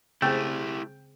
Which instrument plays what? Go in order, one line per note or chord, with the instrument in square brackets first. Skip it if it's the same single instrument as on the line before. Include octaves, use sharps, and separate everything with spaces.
[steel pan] C#3 C4 G#4 [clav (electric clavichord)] A3 [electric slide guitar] E4 G4 [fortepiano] G5